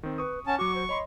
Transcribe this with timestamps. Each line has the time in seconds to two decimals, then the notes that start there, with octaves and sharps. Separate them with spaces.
0.03 D#3 C4
0.18 B4 C#6 D#6
0.47 C#4 F#5 A5
0.59 F#3 F#4 C#6 D6
0.75 C5
0.89 C#5 D#5 B5 C6